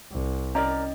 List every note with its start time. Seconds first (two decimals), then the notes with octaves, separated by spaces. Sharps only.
0.12 C2
0.55 C#4 A#4 D5 D#5 A#5